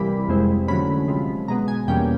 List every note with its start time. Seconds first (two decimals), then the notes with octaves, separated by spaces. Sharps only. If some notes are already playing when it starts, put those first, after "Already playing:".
Already playing: C3 E3 G3 A#3 B5
0.28 F2 C3 E3 G#3 C4
0.68 D3 F#3 A3 C#4 B5
1.08 C3 F3 G#3
1.48 B2 G#3 B3 A#5
1.68 G#5
1.88 E2 B2 G3 A#3 C#4 G5